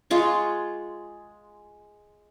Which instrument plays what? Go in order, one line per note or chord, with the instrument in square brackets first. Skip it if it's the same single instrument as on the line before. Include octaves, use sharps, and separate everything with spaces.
[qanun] G#3 F4 C#6